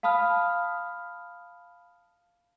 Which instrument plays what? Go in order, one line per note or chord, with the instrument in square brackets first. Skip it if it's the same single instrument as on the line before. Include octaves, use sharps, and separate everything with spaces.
[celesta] F5 A5 B5 D#6 F6